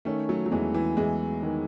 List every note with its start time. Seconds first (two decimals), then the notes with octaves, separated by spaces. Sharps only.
0.05 D#3 A3 C#4
0.29 F#3 A3
0.46 F#3
0.51 E2 E3 G#3
0.74 E3
0.97 E2 E3 G#3
1.43 D#3